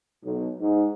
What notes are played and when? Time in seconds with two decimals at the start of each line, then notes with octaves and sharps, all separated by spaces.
0.23 B1
0.59 G#2